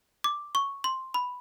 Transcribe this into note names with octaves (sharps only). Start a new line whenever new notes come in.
D6
C#6
C6
B5